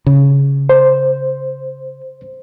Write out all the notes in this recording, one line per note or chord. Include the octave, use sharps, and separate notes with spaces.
C#3
C5